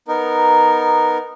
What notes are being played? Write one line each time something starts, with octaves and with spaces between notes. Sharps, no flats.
B3 D#4 A#4